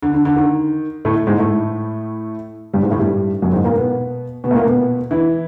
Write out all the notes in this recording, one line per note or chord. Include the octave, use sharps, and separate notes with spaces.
D3
D3
D3
D#3
A2 A3
G#2 G#3
A2 A3
G2 G3
G#2 G#3
A2 A3
G2 G3
F#2 F#3
G#2 G#3
A#2 A#3
B2 B3
B2 B3
A3
A#2 A#3
B2 B3
E3 E4